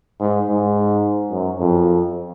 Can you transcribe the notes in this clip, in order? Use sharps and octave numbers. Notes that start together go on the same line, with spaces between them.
G#2
G#2
F#2
F2